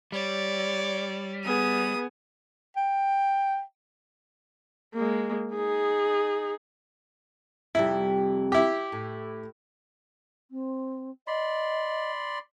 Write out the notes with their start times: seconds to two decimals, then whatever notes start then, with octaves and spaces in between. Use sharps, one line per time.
0.12 G3 C#5 D5
1.45 B3 G#4 D#6
2.76 G5
4.94 G#3 A#3
5.55 D#4 G#4
7.75 F2 C3 G3 E4
8.52 E4 G4
8.92 A2
10.51 C4
11.28 D5 D#5 B5 C6